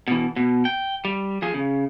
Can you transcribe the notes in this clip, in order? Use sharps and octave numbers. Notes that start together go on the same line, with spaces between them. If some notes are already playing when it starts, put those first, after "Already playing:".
B2 E3
B2
G5
G3
F3 G#4
C#3